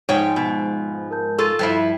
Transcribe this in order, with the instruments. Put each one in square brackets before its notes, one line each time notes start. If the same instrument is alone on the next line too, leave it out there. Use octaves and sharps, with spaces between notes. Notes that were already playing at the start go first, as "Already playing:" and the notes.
[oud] G#2 F3 [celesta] D#4 [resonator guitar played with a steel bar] C#5 G5
[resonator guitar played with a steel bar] B2
[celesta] A#4 A5 G6
[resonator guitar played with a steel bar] F4 A4 [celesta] C#6 D#7
[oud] G2 F3 E4 [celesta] G#6 B6 C7